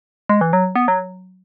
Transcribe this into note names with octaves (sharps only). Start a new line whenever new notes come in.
G#3
E3
F#3
B3
F#3